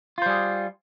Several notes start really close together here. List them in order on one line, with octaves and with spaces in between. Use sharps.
F4 C5 G3 G#4